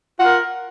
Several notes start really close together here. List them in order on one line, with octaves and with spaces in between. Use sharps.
F4 F#5 A#4